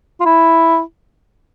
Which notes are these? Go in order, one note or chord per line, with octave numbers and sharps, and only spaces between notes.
F4
E4